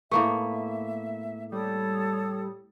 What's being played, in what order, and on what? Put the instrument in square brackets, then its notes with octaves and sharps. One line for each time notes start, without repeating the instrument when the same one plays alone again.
[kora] A2 A#3 B3 [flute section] E5 [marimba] C#6
[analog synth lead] G3 [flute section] A4 C#5 D#6